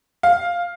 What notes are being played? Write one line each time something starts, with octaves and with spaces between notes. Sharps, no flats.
F5